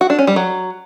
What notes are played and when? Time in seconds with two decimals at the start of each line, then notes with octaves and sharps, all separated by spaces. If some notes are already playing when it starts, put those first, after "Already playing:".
0.01 F#4
0.10 D4
0.19 C#4
0.27 G3
0.36 F#3